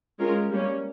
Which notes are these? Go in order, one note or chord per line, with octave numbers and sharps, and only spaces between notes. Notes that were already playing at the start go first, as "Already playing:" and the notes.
G#3 C#4 F4 A#4
G3 A#3 C#4